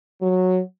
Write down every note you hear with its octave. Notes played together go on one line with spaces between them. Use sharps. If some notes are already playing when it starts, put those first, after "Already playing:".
F#3